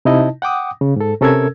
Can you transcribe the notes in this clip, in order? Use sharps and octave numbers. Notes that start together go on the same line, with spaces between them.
C3 D#4 E4 D#5 A5
F#5 G5 D6 D#6
C#3
G#2 A4
C3 C#4 A4 A#4 E6 G#6